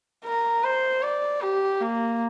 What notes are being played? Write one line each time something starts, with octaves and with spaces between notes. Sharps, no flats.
A#4
C5
D5
G4
A#3